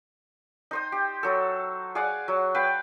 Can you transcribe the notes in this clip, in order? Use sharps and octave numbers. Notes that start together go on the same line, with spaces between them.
D#4 C5 D#6
G4
F#3 A4
G#4 D5 F5 F#5
F#3
B4 F5 G5